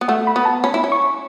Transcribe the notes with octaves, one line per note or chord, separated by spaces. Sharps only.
B3
A3 F#5
B5
B3
A5
C#4 B5
E4
C#4
C#6